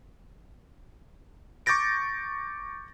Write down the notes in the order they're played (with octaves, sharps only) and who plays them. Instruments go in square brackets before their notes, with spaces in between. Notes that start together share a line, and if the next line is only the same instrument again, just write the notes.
[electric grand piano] C#6 D6 G6 A6 A#6 D7